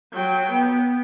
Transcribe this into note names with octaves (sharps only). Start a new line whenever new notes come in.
F#3 G5
B3